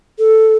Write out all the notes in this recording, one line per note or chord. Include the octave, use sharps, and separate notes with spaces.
A4